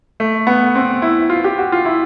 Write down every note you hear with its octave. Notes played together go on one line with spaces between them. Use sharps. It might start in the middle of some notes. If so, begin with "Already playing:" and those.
A3
B3
C4
E4
F4
G4
F#4
F4
E4